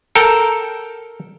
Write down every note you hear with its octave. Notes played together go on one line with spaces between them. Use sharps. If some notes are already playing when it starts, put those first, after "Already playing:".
A4 A#4 G5